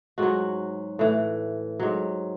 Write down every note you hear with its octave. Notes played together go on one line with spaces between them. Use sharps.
G#2 F#3 F#4
A2 E3
G#2 F#3